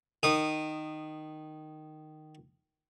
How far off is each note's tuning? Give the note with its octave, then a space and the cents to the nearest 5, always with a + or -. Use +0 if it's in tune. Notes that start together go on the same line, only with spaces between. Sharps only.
D#3 -10 D#6 -20